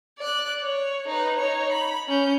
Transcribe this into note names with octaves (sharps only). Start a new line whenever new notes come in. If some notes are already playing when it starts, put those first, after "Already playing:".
D5 F#6
C#5
D#4 B4
D#4 C#5
B5
C#4 G6